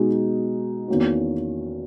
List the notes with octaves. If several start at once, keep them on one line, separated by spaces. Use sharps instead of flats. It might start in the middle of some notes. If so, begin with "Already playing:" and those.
Already playing: B2 G#3 D#4 F#4
E2 D#3 A#3 C#4 F#4